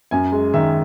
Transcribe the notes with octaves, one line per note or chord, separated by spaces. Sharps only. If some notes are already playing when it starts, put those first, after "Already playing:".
F#2 G#5
G#3
D#3 E5